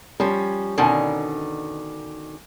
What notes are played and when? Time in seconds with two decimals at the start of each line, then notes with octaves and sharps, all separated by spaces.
0.20 F3 G3 C#4
0.78 B2 D3 D#3 C#4 G#5